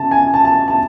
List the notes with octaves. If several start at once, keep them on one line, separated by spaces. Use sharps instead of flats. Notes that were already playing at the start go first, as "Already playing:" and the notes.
Already playing: C#3 A5
G#5
A5
A5
A5